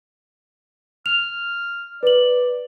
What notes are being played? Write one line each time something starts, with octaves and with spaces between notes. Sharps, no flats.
F6 F7
B4 D5 F#7